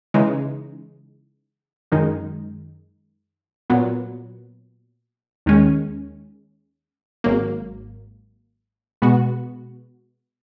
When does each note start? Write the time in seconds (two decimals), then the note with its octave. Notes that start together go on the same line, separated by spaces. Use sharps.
0.14 C#3 E3 G#3 D#4
1.92 F#2 D#3 G#3 D#4
3.70 A#2 F#3 B3
5.46 D#2 D#3 G#3 C#4
7.24 G#1 G#2 F#3 A#3
9.02 B2 G#3 B3 F#4